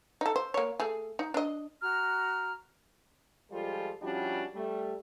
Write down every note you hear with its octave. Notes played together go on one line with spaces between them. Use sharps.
D#4 A4
C5
A#3 C#5
A3 G#4
D#4
D4 D#5
F#4 A#5 F6
F3 G3 G#3 F4 A4 C5
F3 G3 C#4 D4 E4 F#4
G3 A3